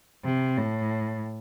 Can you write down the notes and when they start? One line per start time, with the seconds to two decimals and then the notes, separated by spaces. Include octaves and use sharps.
0.24 C3
0.58 A2